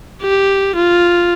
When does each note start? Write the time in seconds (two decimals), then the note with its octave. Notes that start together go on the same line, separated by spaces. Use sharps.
0.22 G4
0.76 F4